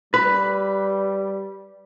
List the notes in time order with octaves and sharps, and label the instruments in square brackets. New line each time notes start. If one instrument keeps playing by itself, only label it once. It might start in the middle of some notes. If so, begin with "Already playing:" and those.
[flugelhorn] G3 [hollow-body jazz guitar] B4